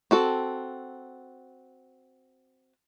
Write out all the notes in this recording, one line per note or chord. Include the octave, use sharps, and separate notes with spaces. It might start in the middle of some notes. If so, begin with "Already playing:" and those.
C4 F#4 A4